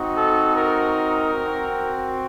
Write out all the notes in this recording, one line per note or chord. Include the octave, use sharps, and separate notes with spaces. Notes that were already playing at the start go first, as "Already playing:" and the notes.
Already playing: C4 D#4 F#4
A4
A#4
C4 F#4